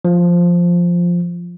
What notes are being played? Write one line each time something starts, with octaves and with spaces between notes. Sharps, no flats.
F3